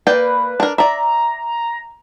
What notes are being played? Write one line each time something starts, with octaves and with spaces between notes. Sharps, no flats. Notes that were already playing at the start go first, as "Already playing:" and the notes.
A#3 B4 D5 G5
D4 A#4
D5 E5 A#5